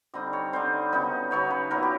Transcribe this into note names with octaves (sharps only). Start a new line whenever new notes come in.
D3 G3 C4 D#4 D#5
C#5
D3 G3 C4 D#4 C5
C#3 F#3 B3 D#4
C#3 F#3 B3 D#4 C#5
B4
A#2 F#3 B3 A#4
G4